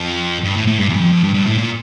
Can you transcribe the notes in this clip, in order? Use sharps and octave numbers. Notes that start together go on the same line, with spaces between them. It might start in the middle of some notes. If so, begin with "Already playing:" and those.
Already playing: F2
G2
A2
A2
G2
E2
G2
F2
F2
G2
G2
A2
A#2